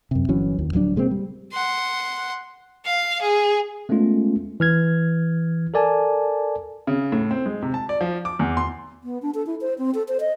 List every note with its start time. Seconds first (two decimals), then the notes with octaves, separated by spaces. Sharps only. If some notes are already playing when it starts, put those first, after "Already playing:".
0.11 F#2 C3
0.28 G1 E3 F#3 C#4
0.59 D#2
0.73 D1 F3 F#3 D4
0.96 C3 G#3 A#3 C4
1.11 G3
1.53 F#5 C6
2.86 F5
3.21 G#4
3.89 G#3 A3 B3 C#4 F4
4.60 E3 F6 G#6
5.74 A4 A#4 D5 G#5 A5
6.87 C#3
7.12 A2
7.31 C4
7.46 G#3
7.62 C3
7.74 A5
7.89 D5
8.01 F3
8.25 D6
8.39 E2
8.57 C6
9.04 B3
9.22 D4
9.35 A4
9.46 E4
9.61 C5
9.78 C4
9.95 A4
10.08 C5
10.20 D#5